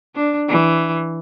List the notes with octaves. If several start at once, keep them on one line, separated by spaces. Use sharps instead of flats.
D4
E3